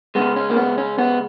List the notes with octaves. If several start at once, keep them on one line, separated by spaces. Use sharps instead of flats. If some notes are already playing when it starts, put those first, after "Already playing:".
C#3 G#3 B3
C#4
A#3
B3
C#4
B3